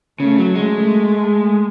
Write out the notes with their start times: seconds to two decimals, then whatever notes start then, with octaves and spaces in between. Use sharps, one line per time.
0.20 C#3 A3
0.38 F#3
0.55 G#3
0.72 A3